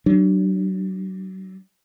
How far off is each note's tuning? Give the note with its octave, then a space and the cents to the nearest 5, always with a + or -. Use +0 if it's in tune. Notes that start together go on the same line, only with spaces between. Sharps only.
F#3 +35 D4 +20